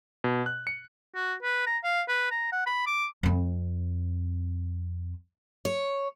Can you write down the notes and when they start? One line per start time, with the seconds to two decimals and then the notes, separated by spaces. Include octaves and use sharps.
0.24 B2
0.46 F#6
0.67 C#7
1.15 F#4
1.43 B4
1.67 A#5
1.84 F5
2.08 B4
2.31 A#5
2.53 F#5
2.67 B5
2.87 D6
3.23 F2 C4
5.65 C#5